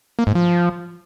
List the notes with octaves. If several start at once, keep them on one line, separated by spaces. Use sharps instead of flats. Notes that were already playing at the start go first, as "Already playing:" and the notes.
A#3
G#2
F3